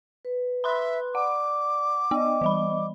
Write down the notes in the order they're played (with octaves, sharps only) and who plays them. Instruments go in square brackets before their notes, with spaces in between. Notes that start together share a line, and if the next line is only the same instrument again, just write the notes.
[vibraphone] B4
[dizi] E5 [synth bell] B5 C6 F#6
[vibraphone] D5 [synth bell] F#5 [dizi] D6
[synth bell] B3 [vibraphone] D5 D#5
[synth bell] E3 G3 B5